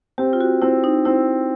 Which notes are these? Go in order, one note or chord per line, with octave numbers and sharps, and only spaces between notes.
C4 G4
F4
F#4
C4 E4
D#4
C4 E4